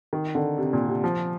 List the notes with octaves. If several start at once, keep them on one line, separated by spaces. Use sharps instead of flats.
D#3
D3
C3
A#2
C3
F3